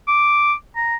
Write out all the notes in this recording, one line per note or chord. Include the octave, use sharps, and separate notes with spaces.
D6
A#5